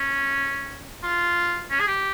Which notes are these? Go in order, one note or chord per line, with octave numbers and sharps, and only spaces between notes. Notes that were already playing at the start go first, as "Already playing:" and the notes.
Already playing: C#4
F4
C#4
G#4
G4